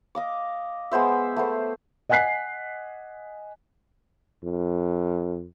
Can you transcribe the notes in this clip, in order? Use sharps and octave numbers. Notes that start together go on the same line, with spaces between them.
D#5 F5 D6
G#3 B3 C5 E5
A3 B3 C5
D#5 F#5 G#5 F#6 B6 C7
F2